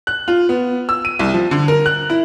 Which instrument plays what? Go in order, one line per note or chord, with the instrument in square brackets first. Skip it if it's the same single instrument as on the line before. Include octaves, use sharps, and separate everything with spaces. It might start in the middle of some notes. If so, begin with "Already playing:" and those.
[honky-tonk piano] F#6
F4
B3
E6
D#7
C2
F3
D3
A#4
F#6
E4